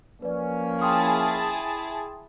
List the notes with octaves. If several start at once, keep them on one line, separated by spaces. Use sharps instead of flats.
F3 A#3 C#4 B4 D5
E4 G#4 G5 A5 C6 D#6